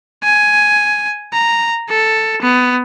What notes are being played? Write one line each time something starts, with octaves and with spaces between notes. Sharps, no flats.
G#5
A#5
A4
B3